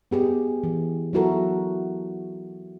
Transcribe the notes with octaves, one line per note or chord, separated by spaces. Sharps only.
B3 G4 G#4
E3
F#3 B3 E4 F#4 A4 A#4